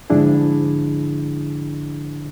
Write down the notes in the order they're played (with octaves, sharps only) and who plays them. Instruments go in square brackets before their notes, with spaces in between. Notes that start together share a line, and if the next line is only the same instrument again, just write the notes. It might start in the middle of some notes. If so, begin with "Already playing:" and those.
[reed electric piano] G#2 D3 F3 D4 E4 G#4